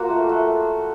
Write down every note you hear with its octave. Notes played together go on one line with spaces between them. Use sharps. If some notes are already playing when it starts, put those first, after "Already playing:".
Already playing: A#3 F4 F#4
A3
A3